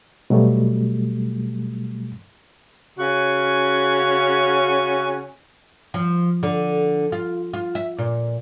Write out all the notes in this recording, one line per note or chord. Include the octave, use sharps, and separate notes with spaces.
B2 F#3 G3 A3
C#3 C#4 F#4
F3
D3
F4
F4
E5
A#2